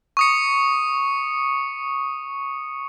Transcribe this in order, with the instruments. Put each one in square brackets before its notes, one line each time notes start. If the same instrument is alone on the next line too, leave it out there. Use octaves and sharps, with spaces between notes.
[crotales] C#6 D#6 C#7